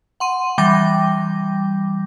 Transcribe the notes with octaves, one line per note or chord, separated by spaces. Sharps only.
F#5 C6 D#7
E3 G3 G5 D6 G6 A#6